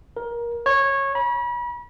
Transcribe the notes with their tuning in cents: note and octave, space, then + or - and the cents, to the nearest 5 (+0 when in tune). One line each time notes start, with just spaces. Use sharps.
A#4 +20
C#5 -15
B5 -40